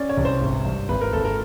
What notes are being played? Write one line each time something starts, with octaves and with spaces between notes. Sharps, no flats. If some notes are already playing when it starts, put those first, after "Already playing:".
Already playing: C#4 D5
C#5
C2
C5
G#1
G2
G#1 B4
A#4
G#1 A4
A#4